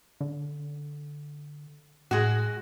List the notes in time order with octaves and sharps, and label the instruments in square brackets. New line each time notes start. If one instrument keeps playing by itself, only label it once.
[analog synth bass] D3
[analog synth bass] A2 [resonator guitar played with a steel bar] G#3 F#4